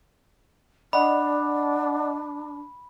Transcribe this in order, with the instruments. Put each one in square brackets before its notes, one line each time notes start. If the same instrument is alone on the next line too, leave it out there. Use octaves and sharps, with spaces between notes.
[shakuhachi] D4 [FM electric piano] D5 D#5 F#5 [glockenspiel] B5